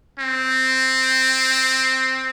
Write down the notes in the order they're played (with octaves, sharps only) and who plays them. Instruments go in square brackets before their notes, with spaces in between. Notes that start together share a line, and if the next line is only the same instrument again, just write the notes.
[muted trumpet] C4